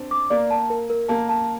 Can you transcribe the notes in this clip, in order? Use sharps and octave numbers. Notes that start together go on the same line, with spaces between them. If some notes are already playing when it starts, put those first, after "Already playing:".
Already playing: C4 D4
D6
A#3 D5
A5
A#4
A#4
A#3 A5
A5